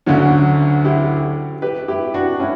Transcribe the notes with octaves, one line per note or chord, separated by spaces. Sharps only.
D2 D3 F#3 C#4 D4 F#4
E4 G4
G4 B4
E4 G4
D4 F#4
C#4 E4